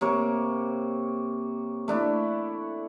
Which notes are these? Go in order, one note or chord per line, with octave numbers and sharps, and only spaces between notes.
C3 A#3 C#5
A3 D4 E4